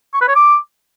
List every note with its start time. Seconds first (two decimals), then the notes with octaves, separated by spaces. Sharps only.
0.14 C#6
0.21 B4
0.28 C#5
0.35 D6